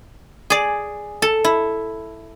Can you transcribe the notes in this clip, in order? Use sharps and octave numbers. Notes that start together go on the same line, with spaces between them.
G#4 D5
A4
E4